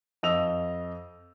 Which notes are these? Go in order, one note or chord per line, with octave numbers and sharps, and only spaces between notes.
F2 D#5 E6 F7